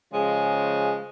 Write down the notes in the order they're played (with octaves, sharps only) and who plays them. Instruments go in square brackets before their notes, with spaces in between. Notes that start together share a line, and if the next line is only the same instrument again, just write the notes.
[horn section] C#3 F3 G#3